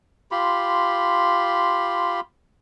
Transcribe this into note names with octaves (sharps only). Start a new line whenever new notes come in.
F4 G4 B5 C6